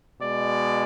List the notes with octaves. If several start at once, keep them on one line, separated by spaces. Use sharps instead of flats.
B2 G#3 D5